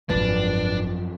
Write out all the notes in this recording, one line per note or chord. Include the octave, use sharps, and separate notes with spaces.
D1 G#1 F#2 F3 D4 B4